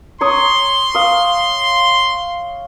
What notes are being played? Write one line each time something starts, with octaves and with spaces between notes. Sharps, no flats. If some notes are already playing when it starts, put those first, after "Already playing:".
C#5 C6 C#6 D#6
F5 D#6